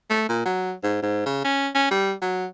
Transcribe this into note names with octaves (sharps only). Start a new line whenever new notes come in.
A3
A#2
F#3
G#2
G#2
C#3
C#4
C#4
G3
F#3